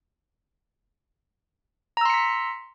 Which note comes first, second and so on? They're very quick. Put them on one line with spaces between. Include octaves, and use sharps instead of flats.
A#5 E6 C6 C#7 B6